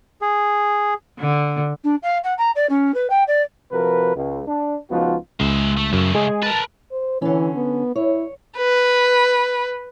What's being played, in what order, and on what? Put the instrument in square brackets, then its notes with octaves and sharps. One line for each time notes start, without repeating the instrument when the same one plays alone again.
[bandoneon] G#4
[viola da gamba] D3
[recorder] D4
F5
F#5
A#5
D5
C#4
B4
G5
D5
[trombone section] C3 F3 F#4 A#4 B4
C#2
D4
C#2 F3 B3 D#4 F4 F#4
[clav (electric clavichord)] C#2 [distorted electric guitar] G#3 E5
[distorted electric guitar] A3
[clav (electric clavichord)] F#2 [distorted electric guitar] C#3 A3
[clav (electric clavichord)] G#3 [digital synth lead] G#4
[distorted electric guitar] A#4 B4 [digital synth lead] A5
[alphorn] C5
[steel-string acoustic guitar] D3 C#4 [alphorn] E3
[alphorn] B3
[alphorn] E4 [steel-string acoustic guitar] C#5
[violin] B4